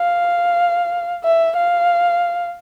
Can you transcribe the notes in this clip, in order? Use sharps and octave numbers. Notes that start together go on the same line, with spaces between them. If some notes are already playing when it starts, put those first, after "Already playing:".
Already playing: F5
E5
F5